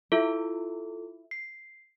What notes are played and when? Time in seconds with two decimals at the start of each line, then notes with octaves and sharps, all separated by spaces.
0.12 E4 F4 A4
1.31 C7